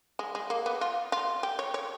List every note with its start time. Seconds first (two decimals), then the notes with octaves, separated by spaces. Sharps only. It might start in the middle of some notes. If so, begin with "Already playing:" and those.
0.19 G#3
0.35 G#3
0.50 A#3
0.66 B3
0.81 F4
1.12 F4
1.43 G4
1.59 C#5
1.74 C#5